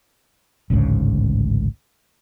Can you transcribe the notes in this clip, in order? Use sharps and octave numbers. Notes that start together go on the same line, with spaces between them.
A1 D2 G#2 C#3